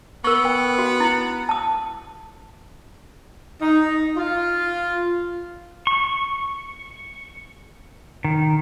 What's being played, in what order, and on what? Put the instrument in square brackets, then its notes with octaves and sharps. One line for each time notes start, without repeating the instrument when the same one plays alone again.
[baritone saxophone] B3 [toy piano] A#4 C#6
[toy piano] G5
F#4
E4
A5 D#6
[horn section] D#4
F4
[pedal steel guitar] C#6
D#3